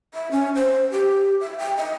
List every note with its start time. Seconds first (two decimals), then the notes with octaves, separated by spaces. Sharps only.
0.14 E5
0.31 C#4
0.55 C5
0.92 G4
1.41 E5
1.58 G5
1.77 D#5